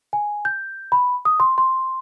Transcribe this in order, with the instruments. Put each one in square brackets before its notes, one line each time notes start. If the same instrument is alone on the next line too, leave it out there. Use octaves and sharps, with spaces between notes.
[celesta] G#5
G6
B5
D#6
C6
C6